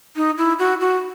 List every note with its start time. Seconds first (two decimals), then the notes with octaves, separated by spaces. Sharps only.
0.16 D#4
0.38 E4
0.59 F#4
0.81 F#4